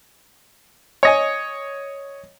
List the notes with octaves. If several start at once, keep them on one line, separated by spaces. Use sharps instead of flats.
C#5 D#5 G#5